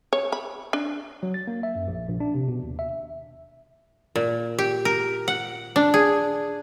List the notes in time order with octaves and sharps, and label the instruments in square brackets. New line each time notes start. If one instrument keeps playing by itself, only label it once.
[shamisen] C#5
B5
D4
[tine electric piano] F#3
A6
A#3
E5
F#2
A#1
A#1
D4
C3
B2
D#2
E5
[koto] A#2
G4
A#4
F#5
D4
G#4